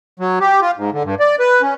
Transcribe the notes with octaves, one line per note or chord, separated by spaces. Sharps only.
F#3
G4
F4
G#2
D3
G2
D5
B4
C#4